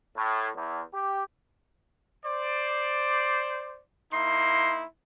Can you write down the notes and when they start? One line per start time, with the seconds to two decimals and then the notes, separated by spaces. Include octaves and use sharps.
0.15 A2
0.55 E2
0.94 G4
2.25 C5 D5
4.13 A#3 D#4 E4 C6